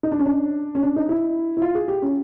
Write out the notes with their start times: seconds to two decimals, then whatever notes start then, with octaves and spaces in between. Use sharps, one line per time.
0.03 D#4
0.11 D4
0.19 C#4
0.26 D4
0.75 C#4
0.82 D4
0.96 D#4
1.09 E4
1.57 E4
1.62 F4
1.75 G#4
1.88 G4
2.02 C#4